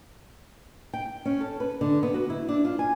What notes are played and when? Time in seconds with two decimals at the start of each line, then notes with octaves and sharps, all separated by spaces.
0.93 G5
1.25 C#4
1.41 A4
1.60 B4
1.81 D3
2.03 B3
2.14 F#4
2.30 E4
2.49 D4
2.65 F4
2.79 G#5